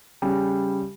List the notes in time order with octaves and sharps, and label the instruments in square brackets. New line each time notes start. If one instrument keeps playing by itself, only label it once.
[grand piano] C#3 G3